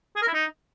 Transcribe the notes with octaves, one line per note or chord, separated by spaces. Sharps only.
G#4
A#4
E4
D#4